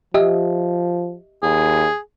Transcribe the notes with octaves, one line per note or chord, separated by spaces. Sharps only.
F3 G4 D#5 E5
D#2 G#4